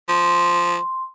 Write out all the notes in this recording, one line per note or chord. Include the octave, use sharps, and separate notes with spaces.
F3 C6